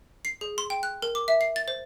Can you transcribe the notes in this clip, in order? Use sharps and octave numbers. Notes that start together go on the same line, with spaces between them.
C7
G#4
C6
G5
F#6
A#4
D6
E5
C7
A6
C5